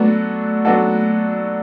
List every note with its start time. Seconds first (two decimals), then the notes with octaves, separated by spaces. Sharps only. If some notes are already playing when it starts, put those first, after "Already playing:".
Already playing: F#3 A3 B3 D4 F#4 A4
0.65 F#3 B3 D4 F#4 A4